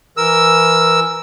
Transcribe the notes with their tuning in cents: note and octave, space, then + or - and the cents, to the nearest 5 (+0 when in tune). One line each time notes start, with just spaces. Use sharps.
E3 +15 A#4 +0 E6 +0